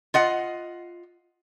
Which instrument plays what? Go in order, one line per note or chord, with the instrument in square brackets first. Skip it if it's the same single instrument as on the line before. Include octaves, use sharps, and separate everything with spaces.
[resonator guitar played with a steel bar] F4 D#5 F#5